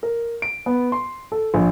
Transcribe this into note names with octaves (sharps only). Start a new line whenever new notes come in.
A#4
D7
B3
C6
A4
A#1